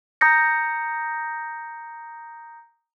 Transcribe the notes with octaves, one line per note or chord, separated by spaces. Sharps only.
A#5 D#6 G6 A#6 C#7